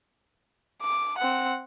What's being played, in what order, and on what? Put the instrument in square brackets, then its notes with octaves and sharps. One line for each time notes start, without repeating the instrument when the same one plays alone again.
[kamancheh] D6
C4 F#5